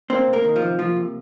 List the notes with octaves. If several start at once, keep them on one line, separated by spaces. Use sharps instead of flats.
A#3 C4 C5
C3
A#3 A#4
D#3
F3 F4
C3
F3 A#3 F4
C3